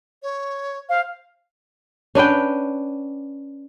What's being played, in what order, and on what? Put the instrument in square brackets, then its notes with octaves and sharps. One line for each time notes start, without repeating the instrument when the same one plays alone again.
[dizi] C#5
[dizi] C5 [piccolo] F5
[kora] C#4 D4 B4 G5